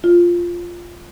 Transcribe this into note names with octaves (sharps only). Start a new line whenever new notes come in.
F4